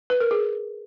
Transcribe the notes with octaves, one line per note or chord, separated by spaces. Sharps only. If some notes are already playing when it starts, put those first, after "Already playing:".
B4
A#4
G#4